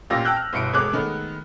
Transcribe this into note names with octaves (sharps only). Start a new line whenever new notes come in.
A1 A#2 F4 G4 E6 A#6
G5 A5 E6 F#6 G6
F6
G1 B2 E4 C#7 D7
E1 G#3 A3 C#5 D6 F#6
D#3 G#3 A3 B3